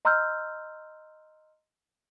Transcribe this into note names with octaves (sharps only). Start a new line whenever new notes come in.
D#5 A#5 C6 E6 F6 G6